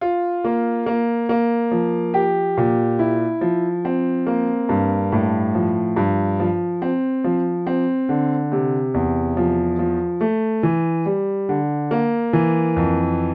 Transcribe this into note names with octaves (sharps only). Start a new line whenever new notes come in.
F4
A#3
A#3
A#3
F3
G4
A#2
E4
F3
C4
A#3
G2
A2
F3
G2
F3
C4
F3
C4
D3
C3
E2
F3
F3
A3
E3
G3
D3
A#3
E3
F2